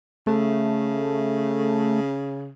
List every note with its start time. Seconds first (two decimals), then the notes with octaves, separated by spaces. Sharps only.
0.27 C#3 A3